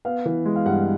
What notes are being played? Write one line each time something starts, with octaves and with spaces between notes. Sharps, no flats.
B3 F5
E3
G#3
F5
G2 F#5